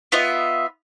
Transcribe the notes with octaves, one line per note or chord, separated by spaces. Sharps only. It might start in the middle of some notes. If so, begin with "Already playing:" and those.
B3 F4 D#5 E5